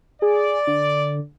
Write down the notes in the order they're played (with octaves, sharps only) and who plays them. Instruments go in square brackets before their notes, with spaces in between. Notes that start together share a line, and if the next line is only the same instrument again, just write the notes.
[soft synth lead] G#4 [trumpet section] D5
[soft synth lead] D3